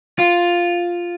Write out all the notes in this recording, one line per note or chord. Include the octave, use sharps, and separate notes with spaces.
F4